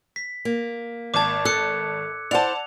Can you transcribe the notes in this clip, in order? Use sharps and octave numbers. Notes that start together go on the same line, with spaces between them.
B6
A#3
G#1 A5 D6 G#6
A4 E6 F#6 C#7
E4 C5 D5 F#5 A5 F7